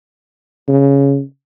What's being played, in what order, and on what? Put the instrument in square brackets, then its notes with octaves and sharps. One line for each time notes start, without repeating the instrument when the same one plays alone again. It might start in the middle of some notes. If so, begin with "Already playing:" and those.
[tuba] C#3